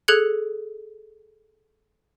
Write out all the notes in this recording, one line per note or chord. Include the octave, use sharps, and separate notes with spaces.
G#4 A4 F#6 G#6 C#7